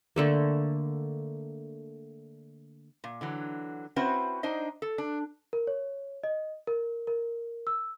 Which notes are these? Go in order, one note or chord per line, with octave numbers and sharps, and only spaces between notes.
D3 A3 A#3
A#2
D3 E3 F#3
C4 C#4 E4 F#4 B4 C5
D4 D#4 C5 D#5
A4
D4
A#4
C#5
D#5
A#4
A#4
E6